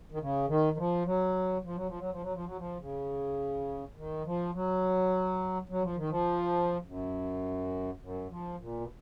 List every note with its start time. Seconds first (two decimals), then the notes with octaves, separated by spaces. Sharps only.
0.12 D#3
0.20 C#3
0.48 D#3
0.73 D#3
0.77 F3
1.06 F#3
1.64 F3
1.76 F#3
1.87 F3
1.99 F#3
2.10 F3
2.22 F#3
2.33 F3
2.46 F#3
2.57 F3
2.80 C#3
3.97 D#3
4.25 F3
4.54 F#3
5.69 F#3
5.83 F3
5.96 D#3
6.09 F3
6.86 F#2
8.01 F#2
8.30 F3
8.60 A#2
8.80 B2